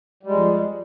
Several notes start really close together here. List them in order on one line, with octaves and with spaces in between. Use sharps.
G3 G#3 F2